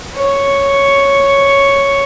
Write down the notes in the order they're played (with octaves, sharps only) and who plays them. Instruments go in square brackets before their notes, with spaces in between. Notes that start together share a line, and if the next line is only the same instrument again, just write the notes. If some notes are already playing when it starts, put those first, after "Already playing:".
[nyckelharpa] C#5